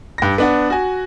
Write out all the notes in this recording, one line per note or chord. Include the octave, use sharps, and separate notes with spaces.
G2 A#6
B3 D4 F#5
F#4 G#5